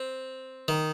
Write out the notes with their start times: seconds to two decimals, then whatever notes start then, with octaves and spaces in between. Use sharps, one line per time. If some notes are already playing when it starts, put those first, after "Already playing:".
Already playing: C4
0.68 D#3